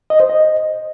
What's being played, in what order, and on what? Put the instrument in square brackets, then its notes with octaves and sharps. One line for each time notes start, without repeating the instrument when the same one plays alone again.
[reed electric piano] D#5
C5
D#5